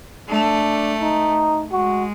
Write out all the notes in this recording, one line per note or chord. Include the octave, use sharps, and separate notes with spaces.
A3 D4
D#4
G#3 F#4